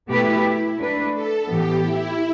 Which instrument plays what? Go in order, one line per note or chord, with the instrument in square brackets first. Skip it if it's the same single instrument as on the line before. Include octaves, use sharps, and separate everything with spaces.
[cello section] B2 A3 G4 B4 [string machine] E4
[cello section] A3 D4 B4
[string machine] A4
[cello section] A2 E3 B3 [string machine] G4
[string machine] E4